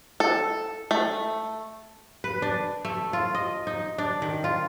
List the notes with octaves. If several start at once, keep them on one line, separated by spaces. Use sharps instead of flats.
A4
A3
B4
D4
A3
F4
D#5
D#4
D4
D#3
F4